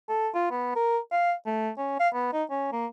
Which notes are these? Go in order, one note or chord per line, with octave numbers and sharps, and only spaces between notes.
A4
F4
B3
A#4
F5
A3
C#4
F5
B3
D#4
C#4
A#3